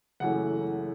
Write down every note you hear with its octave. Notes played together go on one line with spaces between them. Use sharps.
F#1 F#2 E3 A3 F#5